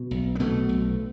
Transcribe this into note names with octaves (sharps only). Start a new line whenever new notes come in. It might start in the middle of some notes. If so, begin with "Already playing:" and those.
Already playing: B2
B1
B3
B2 A3
B1